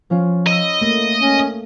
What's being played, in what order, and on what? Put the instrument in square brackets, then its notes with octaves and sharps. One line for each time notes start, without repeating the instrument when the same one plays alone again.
[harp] F3 C#4 F4
[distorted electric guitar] D#5 [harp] B5 E6
[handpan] A3 A#3
[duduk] C#4